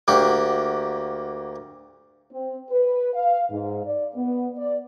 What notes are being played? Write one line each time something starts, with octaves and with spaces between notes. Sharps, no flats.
D2 A#3 F#4 G4
C4
B4
F5
G#2
D5
B3
D5